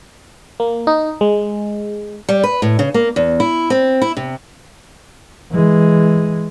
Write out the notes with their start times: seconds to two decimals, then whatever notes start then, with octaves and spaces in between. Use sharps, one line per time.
0.60 A#3
0.87 D#4
1.21 G#3
2.29 G3
2.44 B4
2.62 A2
2.79 C#3
2.94 A#3
3.16 E2
3.40 E4
3.70 C4
4.02 E4
4.17 C3
5.51 E3 G#3